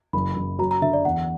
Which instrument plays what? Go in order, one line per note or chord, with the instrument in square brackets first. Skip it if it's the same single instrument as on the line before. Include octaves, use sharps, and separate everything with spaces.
[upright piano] F#1 [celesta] B5
[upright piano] F#1
[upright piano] F#3 [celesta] A#5
[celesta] A#5
[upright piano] D3 [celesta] E5
[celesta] D5
[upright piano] E2 [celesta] F#5